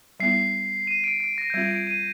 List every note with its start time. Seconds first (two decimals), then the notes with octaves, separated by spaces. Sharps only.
0.20 G3 B3 E4 C7
0.87 D#7
1.04 D7
1.20 D7
1.38 A#6
1.50 G6
1.54 G3 C4 F4 G#6
1.71 D7
1.87 D#7